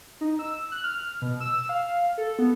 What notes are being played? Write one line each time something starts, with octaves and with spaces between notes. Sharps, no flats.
D#4
E6
F#6
F6
B2
E6
F5
A4
B3